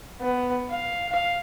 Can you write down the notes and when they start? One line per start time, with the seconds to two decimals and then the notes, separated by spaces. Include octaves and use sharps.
0.21 B3
0.70 F5
1.12 F5